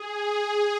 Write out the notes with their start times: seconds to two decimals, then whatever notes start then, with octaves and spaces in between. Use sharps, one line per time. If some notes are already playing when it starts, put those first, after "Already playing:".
Already playing: G#4